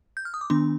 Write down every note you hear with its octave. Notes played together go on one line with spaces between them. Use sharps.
G6
F6
D#6
D6
D#3 B3 D4 C6